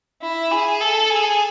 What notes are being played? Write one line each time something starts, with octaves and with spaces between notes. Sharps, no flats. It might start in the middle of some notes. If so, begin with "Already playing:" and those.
E4
G#4
A4
G#4